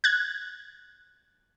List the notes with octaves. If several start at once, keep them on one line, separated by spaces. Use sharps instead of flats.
F#6 G#6